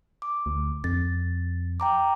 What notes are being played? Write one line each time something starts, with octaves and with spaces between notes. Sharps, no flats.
D6
D2
F2 A6
G5 A#5 D6